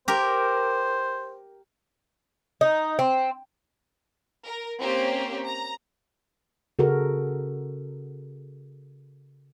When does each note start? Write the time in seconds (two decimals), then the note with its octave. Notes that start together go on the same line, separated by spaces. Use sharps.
0.08 G4 A#4 C5
2.61 D#4
2.99 C4
4.44 A#4
4.79 A#3 C4 C#4 G4 C5
5.44 A#5
6.79 C#3 F#4 A4 A#4